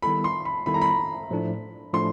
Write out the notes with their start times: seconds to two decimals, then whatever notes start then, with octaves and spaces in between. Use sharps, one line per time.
0.02 D#3 G3 B3 E4 A4 B5
0.24 C6
0.45 B5
0.66 D#3 G3 B3 E4 A4 B5
0.74 A#5
0.82 B5
1.30 A2 F3 A3 D4
1.94 A2 F3 A3 D4 C6